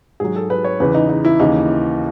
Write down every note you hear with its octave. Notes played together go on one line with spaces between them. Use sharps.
G#2 F#3 G#4
A4
B4
C#5
E2 C#3 E3 B4
D#4
D#4
E4
D#2 C#3 E3 D#4